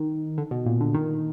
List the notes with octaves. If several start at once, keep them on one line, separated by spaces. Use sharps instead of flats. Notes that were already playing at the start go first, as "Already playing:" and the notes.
Already playing: D#3
D3
B2
A#2
D3
D#3